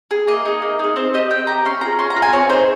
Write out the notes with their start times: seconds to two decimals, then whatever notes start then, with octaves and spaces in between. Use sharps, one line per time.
0.11 G#4
0.27 A#3 D#5
0.45 D#4 G#4
0.62 A#3
0.79 D#4 G#4
0.96 C4 C5
1.14 G4 D#5
1.30 C4 G5
1.47 G4 A#5
1.65 C#4 C6
1.81 F4 G#4 A#5
1.99 C#4 C6
2.10 A#5
2.16 F4 G#4
2.22 G#5
2.32 C4 C#5
2.49 D#4 G#4 C5